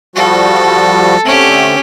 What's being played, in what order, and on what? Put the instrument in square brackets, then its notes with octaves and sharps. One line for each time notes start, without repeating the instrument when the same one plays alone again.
[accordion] F3 G3 F#4 [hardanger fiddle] A4
[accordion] D3 A3 C4 [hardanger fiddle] C#4 G4